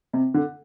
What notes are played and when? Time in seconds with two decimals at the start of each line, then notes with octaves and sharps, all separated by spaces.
0.13 C3
0.34 D3